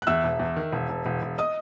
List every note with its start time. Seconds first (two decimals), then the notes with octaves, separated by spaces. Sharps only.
0.02 F#6
0.07 E2 E5 E6
0.24 E1
0.39 E2
0.56 D#3
0.72 E1
0.89 E1
1.06 E1
1.22 E1
1.38 D#5 D#6